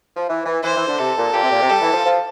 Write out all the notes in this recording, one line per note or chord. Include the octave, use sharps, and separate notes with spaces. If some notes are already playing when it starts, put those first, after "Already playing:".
F3
E3
E3
E3 C5
E3
D3
C3 A4
A#2
A#2 G4
C3
A#2
C3
G3 A4
E3
F3
F3